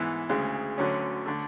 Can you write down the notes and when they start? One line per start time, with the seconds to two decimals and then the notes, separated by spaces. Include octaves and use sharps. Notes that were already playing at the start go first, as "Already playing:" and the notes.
Already playing: G#2 E3 B3 E4
0.29 D2 C#3 G#3
0.78 D2 D3 F#3 C#4
1.26 D3 A3